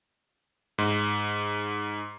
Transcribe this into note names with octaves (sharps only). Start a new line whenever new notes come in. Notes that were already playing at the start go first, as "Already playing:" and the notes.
G#2